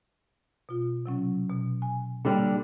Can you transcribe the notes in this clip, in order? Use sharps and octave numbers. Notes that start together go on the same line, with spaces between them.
B2 F4
C3 F#3 C#4
B2
G#5
A#2 D3 G3 A#3